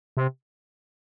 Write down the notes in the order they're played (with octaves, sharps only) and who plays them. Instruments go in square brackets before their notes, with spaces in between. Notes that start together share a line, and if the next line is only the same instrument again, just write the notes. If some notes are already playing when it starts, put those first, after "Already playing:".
[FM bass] C3